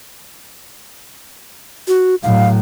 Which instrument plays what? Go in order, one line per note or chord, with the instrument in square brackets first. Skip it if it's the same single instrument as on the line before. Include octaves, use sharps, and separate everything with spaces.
[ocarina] F#4
[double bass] A2 F#3 [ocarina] F5